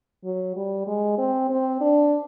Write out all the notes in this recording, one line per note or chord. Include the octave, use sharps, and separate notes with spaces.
F#3
G3
G#3
C4
C4
D4